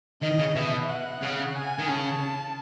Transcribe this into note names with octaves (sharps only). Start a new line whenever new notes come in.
D#3 D#5
C#3
B2 E5
F#5
C#3
G#5
D#3
C#3 A5